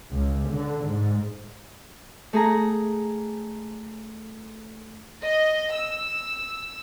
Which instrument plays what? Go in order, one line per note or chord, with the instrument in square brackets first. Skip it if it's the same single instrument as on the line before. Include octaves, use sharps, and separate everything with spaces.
[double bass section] C#2
D3
G#2
[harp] A3 G#4 A#5
[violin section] D#5
E6